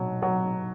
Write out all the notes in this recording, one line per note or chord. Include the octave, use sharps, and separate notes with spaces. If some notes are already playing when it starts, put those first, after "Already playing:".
Already playing: B2 F#3
F#3